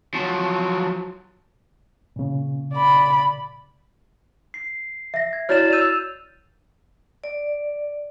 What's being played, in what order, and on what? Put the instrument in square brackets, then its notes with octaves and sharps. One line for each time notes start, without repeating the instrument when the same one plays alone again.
[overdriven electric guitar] F3 F#3
[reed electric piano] A#2 C#3
[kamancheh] D5 B5
[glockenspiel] C7
[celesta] E5 A#6
[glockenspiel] G#6
[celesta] E4 F#4 C#5 [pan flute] D5 [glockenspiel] F6 A6 E7
[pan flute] E6 [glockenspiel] G6 D#7 F7
[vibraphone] D5